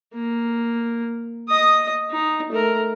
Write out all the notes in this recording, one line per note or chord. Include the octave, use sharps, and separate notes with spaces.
A#3
D#5 D#6
D#4
A3 A#4